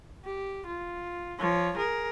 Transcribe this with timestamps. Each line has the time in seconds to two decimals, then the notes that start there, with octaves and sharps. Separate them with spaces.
0.25 G4
0.67 F4
1.39 F3 C#5
1.77 G#4 A#4